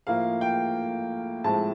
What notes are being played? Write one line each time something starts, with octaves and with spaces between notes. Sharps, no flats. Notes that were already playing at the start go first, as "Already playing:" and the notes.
A2 F3 A#3 F5
G5
A2 F3 G#3 C4 A5